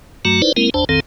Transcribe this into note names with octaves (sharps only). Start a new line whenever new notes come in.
G2 F#3 A3 F#4 A#5
D#4 E4 B4 C5 D5
G#3 A#3 C4 E4 A#4
G1 E2 D4 C5 A5
A#1 F2 D#3 C4 A4